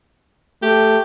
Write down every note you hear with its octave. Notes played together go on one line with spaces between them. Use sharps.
A3 G4